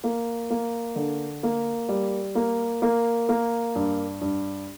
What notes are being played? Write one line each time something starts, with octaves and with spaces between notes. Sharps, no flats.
A#3
A#3
D3
A#3
G3
A#3
A#3
A#3
G2
G2